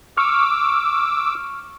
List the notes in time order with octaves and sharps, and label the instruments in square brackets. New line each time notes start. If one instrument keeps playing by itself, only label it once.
[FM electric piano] C#6 F6 [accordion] D6 E6